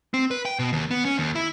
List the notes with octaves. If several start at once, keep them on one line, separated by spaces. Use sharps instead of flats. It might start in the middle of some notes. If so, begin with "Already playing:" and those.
C4
B4
G5
B2
D#2
B3
C#4
D#2
E4